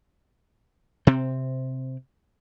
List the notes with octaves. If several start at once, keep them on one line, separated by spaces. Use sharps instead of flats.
C3 C4